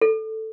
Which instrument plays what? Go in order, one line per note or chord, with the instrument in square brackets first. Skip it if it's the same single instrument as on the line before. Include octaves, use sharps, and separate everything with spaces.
[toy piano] A4